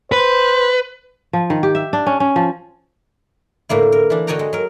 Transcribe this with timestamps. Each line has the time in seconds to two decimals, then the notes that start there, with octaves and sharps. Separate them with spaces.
0.12 B4 C5
1.33 F3
1.50 D#3
1.63 G4
1.75 E5
1.93 D4
2.06 C#4
2.20 C#4
2.36 F3
3.69 A2 D3 A#3 E4
3.92 A#4
4.10 E3 D4
4.27 D3 F#4 C#5 D#5 G5 A#5
4.39 G#3
4.53 F#3 A#4